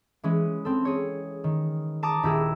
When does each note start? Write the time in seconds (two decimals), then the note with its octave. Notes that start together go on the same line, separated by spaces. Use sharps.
0.23 E3 G#3 C#4
0.65 C4 A4
0.85 G#4 C#5
1.44 D#3
2.03 A5 A#5 D6 D#6 A6 A#6
2.23 D#1 E4 G4 G#4 E6